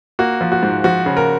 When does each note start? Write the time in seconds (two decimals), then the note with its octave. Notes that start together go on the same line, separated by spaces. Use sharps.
0.19 A#3 F#4
0.41 F3
0.52 F#4
0.63 G#2
0.84 F3 F#4
1.06 C#3
1.17 A#4